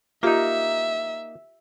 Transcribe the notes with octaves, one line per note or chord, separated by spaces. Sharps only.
A#3 D#4 F4 G4 E5 F5